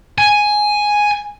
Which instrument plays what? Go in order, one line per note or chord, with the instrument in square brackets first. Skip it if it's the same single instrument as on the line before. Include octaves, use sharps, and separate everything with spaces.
[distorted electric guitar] G#5